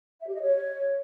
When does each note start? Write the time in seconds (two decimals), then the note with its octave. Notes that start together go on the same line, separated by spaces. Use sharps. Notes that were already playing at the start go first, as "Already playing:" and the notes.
0.20 E5
0.27 G4
0.34 D#5
0.41 C#5